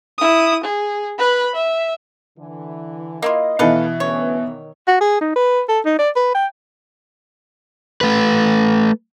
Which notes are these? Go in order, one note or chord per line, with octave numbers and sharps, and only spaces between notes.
E4 D#6
G#4
B4 B5
E5
D3 E3
A#3 E4 F4 D#5
B2 E3 A4 B4 F5
D2 C#4 B4 C#5
D#3
F#4
G#4
D#4
B4
A4
D#4
D5
B4
G5
A3 B4